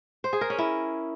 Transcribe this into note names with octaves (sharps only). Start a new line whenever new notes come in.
C5
G#4
A#4
C#4
E4